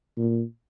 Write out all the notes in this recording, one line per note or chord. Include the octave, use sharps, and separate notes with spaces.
A#2